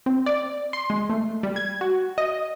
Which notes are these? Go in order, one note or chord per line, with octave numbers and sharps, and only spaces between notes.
C4
D5
C6
G#3
A3
G3
G#6
F#4
D#5